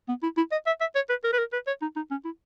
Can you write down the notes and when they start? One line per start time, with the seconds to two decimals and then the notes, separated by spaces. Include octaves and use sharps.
0.08 B3
0.23 E4
0.37 E4
0.52 D#5
0.66 E5
0.81 E5
0.95 C#5
1.09 B4
1.24 A#4
1.33 B4
1.39 A#4
1.53 B4
1.67 C#5
1.81 D#4
1.96 D#4
2.11 C#4
2.25 E4